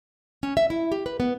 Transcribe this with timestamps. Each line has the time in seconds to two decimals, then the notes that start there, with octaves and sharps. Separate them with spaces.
0.43 C#4
0.57 E5
0.70 E4
0.92 G4
1.06 B4
1.20 B3